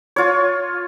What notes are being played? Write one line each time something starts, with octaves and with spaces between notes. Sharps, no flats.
F4 C#5